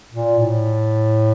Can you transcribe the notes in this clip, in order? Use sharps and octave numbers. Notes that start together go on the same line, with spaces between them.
A#2
A2